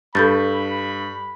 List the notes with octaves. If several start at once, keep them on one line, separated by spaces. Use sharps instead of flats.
G2 A4 B5 G6 A6